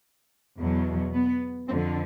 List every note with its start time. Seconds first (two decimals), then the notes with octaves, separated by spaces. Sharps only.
0.58 E2 B2 F#3
1.13 B3
1.69 F2 D3 F3 C4